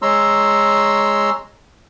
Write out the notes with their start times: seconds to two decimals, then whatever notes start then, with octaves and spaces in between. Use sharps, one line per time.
0.02 G#3 C#5 A#5 C6 E6